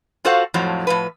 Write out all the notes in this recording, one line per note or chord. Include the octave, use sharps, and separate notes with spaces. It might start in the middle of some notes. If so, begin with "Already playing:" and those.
F4 F#4 A4 C5 F5 F#5
F2 A2 F3 F#3
A2 F3 B4